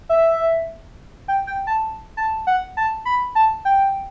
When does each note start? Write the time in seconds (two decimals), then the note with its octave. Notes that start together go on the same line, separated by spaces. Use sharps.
0.09 E5
1.28 G5
1.47 G5
1.67 A5
2.17 A5
2.47 F#5
2.77 A5
3.05 B5
3.35 A5
3.65 G5